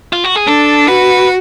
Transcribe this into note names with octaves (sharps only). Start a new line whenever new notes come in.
F4
F#4
G#4
D4 A4
F#4 B4